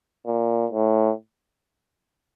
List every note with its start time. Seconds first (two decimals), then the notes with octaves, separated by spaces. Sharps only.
0.26 A#2
0.72 A2